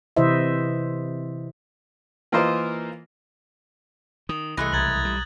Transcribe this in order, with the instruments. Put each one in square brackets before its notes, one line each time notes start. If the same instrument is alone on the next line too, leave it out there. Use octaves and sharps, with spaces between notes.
[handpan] C3 E3 E4 C5 D#5 E5
[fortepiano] E3 A#3 F4 A#4 C5 D#5
[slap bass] D#3 [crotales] D#6
[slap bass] C2 [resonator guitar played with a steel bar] E3 G#3 A3 [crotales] F#6 A#6
[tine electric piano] B1 A#5 [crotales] G#6 A6 F#7
[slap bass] G3